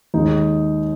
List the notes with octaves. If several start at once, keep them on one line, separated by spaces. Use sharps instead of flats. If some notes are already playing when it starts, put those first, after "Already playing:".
D#2 D#3 G#3 D#4